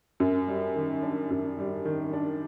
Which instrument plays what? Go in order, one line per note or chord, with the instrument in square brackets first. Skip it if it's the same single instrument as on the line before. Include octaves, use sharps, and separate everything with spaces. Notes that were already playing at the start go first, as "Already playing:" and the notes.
[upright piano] F#2
G3
D#3
D4
F#2
G3
D#3
D4